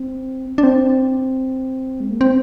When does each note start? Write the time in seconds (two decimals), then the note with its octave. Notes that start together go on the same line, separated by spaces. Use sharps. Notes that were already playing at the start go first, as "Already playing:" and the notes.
Already playing: C4
0.58 D4
0.63 C4
2.00 G#3
2.11 A#3
2.21 C4